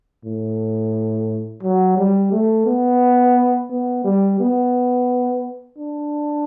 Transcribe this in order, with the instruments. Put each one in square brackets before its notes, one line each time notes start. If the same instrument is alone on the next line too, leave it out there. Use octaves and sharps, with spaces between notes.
[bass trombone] A2
F#3
G3
A3
B3
B3
G3
B3
D4